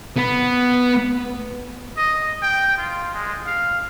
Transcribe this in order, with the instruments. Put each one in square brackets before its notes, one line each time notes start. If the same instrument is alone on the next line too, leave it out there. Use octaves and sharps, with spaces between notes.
[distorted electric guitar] B3 B4
[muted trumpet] D#5
G5
F4
G#3
F5